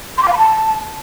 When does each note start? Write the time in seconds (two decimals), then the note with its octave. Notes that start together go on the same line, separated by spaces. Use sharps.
0.18 C6
0.23 D6
0.28 F5
0.33 B5
0.38 A5